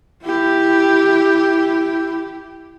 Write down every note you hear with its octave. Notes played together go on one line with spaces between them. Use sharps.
E4 G4